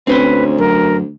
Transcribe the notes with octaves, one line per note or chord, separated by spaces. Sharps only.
D2 C4 C#4 B4 C5
F#2 A#4